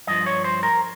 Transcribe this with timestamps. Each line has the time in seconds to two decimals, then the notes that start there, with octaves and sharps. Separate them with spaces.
0.07 G2 F3 D#5
0.26 C#5
0.44 C5
0.63 A#4